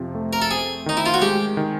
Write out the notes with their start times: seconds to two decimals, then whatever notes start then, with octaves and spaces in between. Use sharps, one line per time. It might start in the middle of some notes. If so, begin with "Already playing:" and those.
Already playing: F2 C3 F3
0.15 A3
0.33 A#4
0.42 A4
0.51 C4 G#4
0.86 D#3 D#4
0.97 E4
1.06 F4
1.14 F#4
1.22 G#3 G4
1.57 D#3